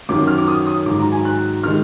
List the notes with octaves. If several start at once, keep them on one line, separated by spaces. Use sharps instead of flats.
F#2 D#3 F#3 D6
F6
D6
D#6
D#6
G#2 D#3 F#3 D6
A#5
G#5
F#6
D#3 G#3 F6